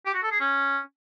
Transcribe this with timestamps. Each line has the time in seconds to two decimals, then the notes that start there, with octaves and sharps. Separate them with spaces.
0.06 G4
0.14 F#4
0.23 A4
0.32 G#4
0.40 C#4